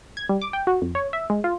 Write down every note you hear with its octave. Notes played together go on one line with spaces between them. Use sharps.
G#6
G3
D6
G5
F#4
F2
C#5
E5
G#3
F4